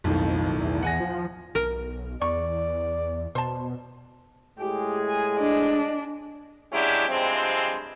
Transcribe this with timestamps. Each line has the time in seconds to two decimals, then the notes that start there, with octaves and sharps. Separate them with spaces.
0.04 B1 F2 A2 D#3
0.60 E2
0.83 F#5 G#5 A#6
1.00 F3
1.55 B1 A#4
2.22 E2 D5 C#6
3.35 B2 C5 A5
4.59 A2 G#3 G4 G#4
5.07 G#5
5.40 D4 D#5
6.73 F#3 G#3 C#4 D4 E4 G4
7.09 G2 C3 F3 G#3 C4